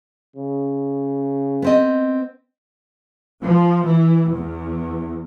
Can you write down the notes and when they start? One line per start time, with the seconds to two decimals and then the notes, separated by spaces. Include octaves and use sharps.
0.36 C#3
1.62 B3 C4 D#5
3.41 F3
3.85 E3
4.33 E2